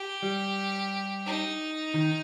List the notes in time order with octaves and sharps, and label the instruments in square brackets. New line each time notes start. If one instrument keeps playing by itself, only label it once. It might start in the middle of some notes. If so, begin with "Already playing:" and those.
Already playing: [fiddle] G4
[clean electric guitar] G3
[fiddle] D#4
[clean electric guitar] D#3